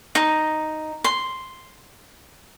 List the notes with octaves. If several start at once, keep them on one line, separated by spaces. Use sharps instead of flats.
D#4
C6